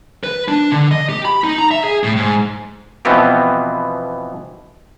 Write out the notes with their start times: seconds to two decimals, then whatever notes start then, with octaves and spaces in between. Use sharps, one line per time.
0.24 B4
0.48 D4
0.72 D3
0.91 D#5
1.10 G4
1.25 B5
1.44 D#4
1.58 A#5
1.71 E5
1.84 G#4
2.04 A2
2.16 G#2
3.05 B2 E3 F3 B3 C4 G4